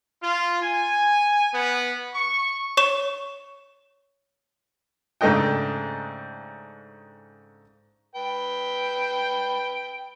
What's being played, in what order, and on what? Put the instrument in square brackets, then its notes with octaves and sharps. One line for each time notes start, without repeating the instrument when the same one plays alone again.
[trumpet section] F4
G#5
B3
C#6
[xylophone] C#5 C#6 E7
[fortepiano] G#2 C#3 A3 D4 D#5 G5
[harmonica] B4 G5